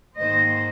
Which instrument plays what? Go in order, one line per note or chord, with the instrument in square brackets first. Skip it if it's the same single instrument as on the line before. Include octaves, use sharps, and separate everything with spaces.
[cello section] G#2 D#3 A#3 C5 D#5